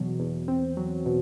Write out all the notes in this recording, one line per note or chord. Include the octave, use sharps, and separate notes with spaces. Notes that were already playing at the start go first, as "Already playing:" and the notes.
Already playing: E2 B2 F#3
E2
C4
F#3
B2